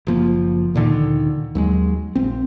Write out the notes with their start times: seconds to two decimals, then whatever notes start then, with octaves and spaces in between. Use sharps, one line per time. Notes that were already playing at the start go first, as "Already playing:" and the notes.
0.07 F#1 F3 A#3
0.74 D2 A#2 D3 D#3
1.55 D#2 F#3 G#3
2.15 A#1 C4